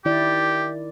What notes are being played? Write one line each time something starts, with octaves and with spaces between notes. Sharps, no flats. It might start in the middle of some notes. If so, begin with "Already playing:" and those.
D#3 E4 G4 D5